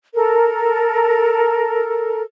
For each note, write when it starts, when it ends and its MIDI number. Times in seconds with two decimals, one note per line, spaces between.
0.14 2.22 69
0.14 2.22 70